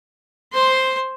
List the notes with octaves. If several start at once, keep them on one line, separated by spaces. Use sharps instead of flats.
C5 C6